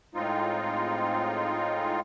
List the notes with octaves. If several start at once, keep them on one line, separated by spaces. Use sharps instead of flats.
A2 G#3 C4 D#4 F4